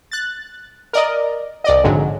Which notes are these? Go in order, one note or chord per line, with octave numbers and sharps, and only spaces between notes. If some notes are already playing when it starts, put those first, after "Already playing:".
F#6 A6
A#4 D5 D#5
C2 D5 D#5
A#1 F2 G#2 D3 F#3